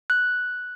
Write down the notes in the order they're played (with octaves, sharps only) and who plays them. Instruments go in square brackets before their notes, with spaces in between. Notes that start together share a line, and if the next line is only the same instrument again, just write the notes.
[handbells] F#6